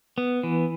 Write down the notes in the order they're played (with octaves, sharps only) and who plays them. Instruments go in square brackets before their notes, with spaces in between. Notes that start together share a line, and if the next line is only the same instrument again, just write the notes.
[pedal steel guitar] B3
E3